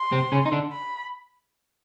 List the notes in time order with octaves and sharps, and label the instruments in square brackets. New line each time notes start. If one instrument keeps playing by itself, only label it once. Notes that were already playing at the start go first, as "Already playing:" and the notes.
Already playing: [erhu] C6
[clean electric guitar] C3 C4
C#3 C#4
D#4
D3 D4
[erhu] B5